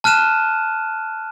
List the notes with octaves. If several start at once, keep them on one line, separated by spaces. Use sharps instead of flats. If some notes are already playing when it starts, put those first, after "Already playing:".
A5 F6 F#6 D#7 E7